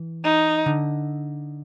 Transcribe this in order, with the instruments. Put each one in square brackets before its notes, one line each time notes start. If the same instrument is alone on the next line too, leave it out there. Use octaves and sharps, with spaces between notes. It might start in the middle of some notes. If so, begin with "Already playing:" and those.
Already playing: [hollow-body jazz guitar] E3
[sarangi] D#4
[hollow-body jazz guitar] D3